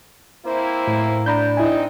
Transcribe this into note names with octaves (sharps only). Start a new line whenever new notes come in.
A#3 C4 E4 C5
A2
D4 A#5 B5 G6
G#3 C4 D#4 E4 G#5